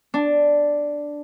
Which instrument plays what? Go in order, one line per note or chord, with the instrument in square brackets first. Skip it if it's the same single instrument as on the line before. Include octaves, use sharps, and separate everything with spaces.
[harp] D4